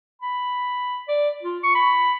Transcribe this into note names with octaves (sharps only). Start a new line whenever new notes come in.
B5
D5
F4
C#6
B5